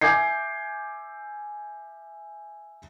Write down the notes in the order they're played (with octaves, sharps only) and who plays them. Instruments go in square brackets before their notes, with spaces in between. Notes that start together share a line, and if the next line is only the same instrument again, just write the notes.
[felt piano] E5 G#5 D6 G6 G#6 C7